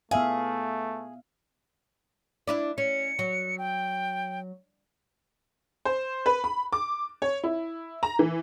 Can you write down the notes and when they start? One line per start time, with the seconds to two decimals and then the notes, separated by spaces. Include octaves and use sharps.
0.11 A3 B3 G#4 E5 F5
2.47 D4 E4 D5
2.78 C#4 C#7
3.19 F#3
3.58 G5
5.85 C5
6.26 B4
6.44 B5
6.73 D6
7.22 C#5
7.44 E4
8.03 A#5
8.19 E3